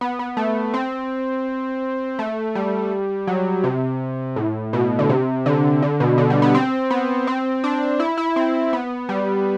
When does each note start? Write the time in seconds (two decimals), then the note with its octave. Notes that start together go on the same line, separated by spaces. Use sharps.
0.01 B3
0.19 B3
0.37 A3
0.74 C4
2.19 A3
2.55 G3
3.27 F#3
3.64 C3
4.36 A2
4.73 B2
4.99 D3
5.09 C3
5.46 D3
5.82 D3
6.00 B2
6.18 D3
6.30 G3
6.42 B3
6.54 C4
6.90 B3
7.27 C4
7.64 D4
7.99 E4
8.18 E4
8.36 C4
8.73 B3
9.09 G3